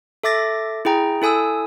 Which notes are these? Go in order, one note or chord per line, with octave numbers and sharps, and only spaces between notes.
A4 E5 D6 A6 A#6
E4 G#4 G5 A#5
E4 A4 G#5 D#6 E6